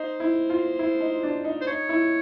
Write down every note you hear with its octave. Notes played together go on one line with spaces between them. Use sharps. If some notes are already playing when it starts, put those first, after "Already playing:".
Already playing: D#4 C5
E4
F4
E4
D#4
D4
D#4
C5
D#4 C#5
E4